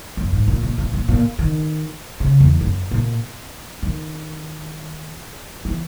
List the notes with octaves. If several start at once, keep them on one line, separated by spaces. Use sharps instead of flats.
F#2
G#2
A#2
A#2
A#2
A#2
A#2
D#3
C#3
E2
F#2
A#2
D#3
E3